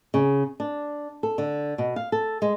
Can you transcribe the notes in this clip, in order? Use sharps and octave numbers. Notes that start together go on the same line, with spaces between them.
C#3
D4
A4
D3
B2
F5
A4
G#3